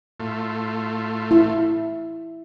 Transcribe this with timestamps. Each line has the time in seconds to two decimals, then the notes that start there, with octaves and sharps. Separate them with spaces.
0.20 A2 A3 F4
1.31 E4